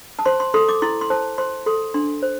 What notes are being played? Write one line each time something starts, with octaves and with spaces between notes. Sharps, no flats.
A5
C5 C6
C6
A4 C6
D6
E4 C6
C6
C5 A5
C5 C6
A4 C6
D4 C6
C5